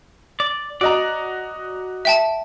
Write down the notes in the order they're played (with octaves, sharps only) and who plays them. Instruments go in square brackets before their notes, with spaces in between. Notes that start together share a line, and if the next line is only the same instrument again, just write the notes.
[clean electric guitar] D5
[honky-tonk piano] F#4 D#5 A#5 [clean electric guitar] D5
[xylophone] E5 G5 A5